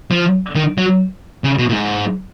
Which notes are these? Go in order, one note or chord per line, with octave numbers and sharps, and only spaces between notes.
F3
D#3
F#3
C#3
B2
A#2
G#2